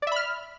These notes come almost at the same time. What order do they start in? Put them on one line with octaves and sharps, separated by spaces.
D5 E5 B5 F6